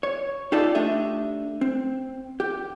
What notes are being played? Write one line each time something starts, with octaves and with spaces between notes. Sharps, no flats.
C#5
D#4 F4 G4 A4 D5
A3 D4 G4 D#5 E5
C4
G4